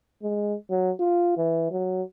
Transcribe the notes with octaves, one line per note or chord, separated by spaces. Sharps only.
G#3
F#3
F4
E3
F#3